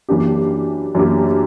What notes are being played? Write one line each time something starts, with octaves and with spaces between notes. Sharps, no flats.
F#2 E3 A#3 D4 G4
F#2 E3 A#3 D4 G4